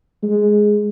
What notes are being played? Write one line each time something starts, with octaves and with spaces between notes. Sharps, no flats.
G#3